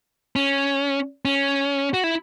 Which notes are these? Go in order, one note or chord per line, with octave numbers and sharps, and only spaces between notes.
C#4
C#4
F#4
E4